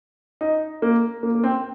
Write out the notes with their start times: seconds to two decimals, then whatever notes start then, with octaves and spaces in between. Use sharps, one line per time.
0.41 D#4
0.82 A#3
1.23 A#3
1.35 A#3
1.44 C4